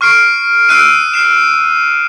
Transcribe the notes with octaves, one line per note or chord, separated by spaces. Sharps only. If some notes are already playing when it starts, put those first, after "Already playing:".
C#6 F6 C7 D7
D#6 E6 F#6 C7 D7 D#7
F6 C7 E7